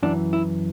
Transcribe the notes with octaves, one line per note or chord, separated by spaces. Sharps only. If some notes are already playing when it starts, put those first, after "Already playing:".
F#2 E3 D4
E4